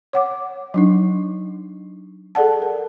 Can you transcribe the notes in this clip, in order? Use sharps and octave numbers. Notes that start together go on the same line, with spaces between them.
C#5 F#5 D6
F#3 D4 D#4
G#4 A4 D5 F#5 A5
A#4